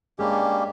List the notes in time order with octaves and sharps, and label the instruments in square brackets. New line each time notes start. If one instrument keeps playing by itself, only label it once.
[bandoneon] G2 G3 A#3 C#4 G4 [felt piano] G#3 G#4